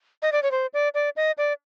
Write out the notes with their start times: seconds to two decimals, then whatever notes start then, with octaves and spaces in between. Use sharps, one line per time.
0.22 D#5
0.32 D5
0.43 C#5
0.51 C5
0.74 D5
0.94 D5
1.16 D#5
1.38 D5